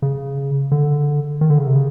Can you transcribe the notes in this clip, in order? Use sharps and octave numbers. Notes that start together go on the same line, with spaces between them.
C#3
D3
D#3
D3
C#3
C3
C#3